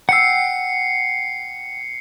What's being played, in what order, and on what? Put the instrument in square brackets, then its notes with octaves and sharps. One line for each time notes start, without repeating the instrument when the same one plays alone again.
[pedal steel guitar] F#5 G5 E6 [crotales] C7 C#7